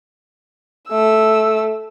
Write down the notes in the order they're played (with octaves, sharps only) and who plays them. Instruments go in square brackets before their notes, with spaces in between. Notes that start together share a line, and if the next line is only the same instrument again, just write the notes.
[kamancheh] A3 E6